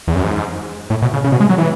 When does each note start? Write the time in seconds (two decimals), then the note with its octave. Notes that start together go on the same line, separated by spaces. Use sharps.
0.08 E2
0.16 F#2
0.24 G#2
0.90 A2
1.02 B2
1.13 C#3
1.24 C#3
1.32 B2
1.40 G#3
1.49 F#3
1.58 E3